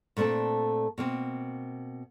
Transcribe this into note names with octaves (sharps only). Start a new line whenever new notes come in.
A#2 A3 C4 D4 A4
B2 A#3 C4